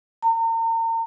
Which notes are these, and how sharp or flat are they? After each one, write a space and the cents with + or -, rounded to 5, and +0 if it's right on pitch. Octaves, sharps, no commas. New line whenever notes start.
A#5 -40